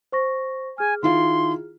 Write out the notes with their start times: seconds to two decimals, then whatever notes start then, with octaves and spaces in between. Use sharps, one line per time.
0.12 C5 C#6 A#6
0.78 G#4 G#5 F6
1.03 D#3 E4 F4 C6